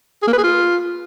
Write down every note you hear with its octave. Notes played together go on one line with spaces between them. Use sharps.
G#4
A#3
B4
G#4
F4